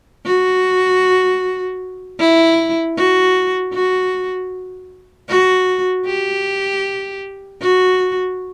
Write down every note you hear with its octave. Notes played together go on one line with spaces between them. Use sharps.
F#4
E4
F#4
F#4
F#4
G4
F#4